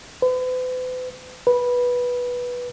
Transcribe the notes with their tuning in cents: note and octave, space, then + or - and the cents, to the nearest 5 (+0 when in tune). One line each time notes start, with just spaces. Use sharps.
B4 +45
B4 -10